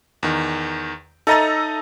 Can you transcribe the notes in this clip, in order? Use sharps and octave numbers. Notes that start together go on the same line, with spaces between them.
E2 D#3
D#4 A4 D#5 E5 A#5 A6